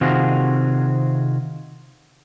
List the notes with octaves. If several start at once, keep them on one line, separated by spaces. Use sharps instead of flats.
C3 D#3 C4 F4 F#4 G#4